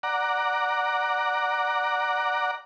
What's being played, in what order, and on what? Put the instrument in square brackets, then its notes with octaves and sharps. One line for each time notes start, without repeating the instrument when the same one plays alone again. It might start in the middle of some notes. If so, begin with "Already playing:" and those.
[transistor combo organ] D5 F#5 A#5